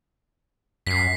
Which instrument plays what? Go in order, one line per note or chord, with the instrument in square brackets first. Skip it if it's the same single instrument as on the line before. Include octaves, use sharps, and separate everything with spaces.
[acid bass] F#2 [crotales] B6 C7